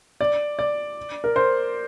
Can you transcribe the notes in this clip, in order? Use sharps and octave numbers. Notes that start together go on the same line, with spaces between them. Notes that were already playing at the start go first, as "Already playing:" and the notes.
D5
D5
A#4
C5